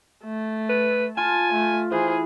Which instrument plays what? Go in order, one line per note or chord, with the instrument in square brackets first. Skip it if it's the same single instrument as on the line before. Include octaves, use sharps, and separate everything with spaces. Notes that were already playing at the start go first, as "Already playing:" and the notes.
[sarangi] A3
[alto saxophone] B4
[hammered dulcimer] F4 [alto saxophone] G#5 [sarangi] A5
[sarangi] A3
[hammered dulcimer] E3 [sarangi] G#4 [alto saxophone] C5